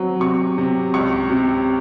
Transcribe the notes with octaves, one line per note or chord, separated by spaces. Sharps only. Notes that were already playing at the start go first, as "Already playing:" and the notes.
Already playing: F#3 C4
C3 C#6
C3
C#2 C#6
C3